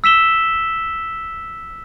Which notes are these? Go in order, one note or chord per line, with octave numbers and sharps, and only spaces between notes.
E6 B6 E7 G7